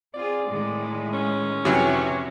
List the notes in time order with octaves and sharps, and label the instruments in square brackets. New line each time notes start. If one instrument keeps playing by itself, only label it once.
[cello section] C4 F4 G#4 [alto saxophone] D5
[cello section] A2 D#3 G#3
[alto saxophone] C#4
[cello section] F2 F#4 C#5 [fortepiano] C3 E3 F#3